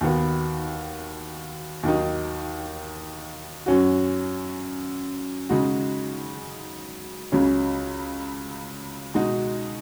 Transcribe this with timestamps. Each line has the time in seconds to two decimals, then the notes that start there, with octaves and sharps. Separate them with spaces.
0.01 D#2 D#3 B3 F#4
1.83 D#2 D#3 F#3 D#4
3.66 F#2 F#3 C#4 F#4
5.49 C#3 G#3 D#4 F#4
7.32 C#2 C#3 F#3 C#4
9.14 B2 G#3 D#4 F#4